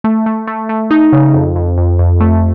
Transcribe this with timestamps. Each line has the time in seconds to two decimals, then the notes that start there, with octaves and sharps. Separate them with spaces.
0.04 A3
0.26 A3
0.47 A3
0.69 A3
0.91 D#4
1.13 C#3
1.34 F2
1.56 F2
1.78 F2
1.99 F2
2.21 A3